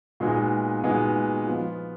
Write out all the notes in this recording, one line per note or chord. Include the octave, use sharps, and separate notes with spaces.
A#2 G#3 B3 D#4 F#4
A#2 G#3 B3 D#4 F#4
F3 B3 F4